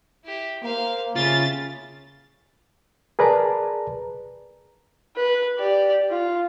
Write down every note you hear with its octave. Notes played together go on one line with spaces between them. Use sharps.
E4 G4
A#3 C5 F5
C#3 F4 G4 E5 A6
G#4 A#4 B4 D5 A5 A#5
B4
G4 D5
F4